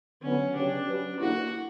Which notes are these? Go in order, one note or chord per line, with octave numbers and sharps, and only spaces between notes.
D3 F#3 B3 C#4
C#3 F#3 C#4 D4 G4
F#3 C#4 G4 B4
D3 A#3 E4 F#4